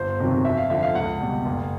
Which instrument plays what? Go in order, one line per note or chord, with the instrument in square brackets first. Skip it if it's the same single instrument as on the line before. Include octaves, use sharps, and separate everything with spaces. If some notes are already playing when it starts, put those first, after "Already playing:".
Already playing: [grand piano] G1 C5
F2 C3 D#3 F#3
F2 E5
F5
D3 F3 E5
F5
C#2 F#5
B2 G3
F#1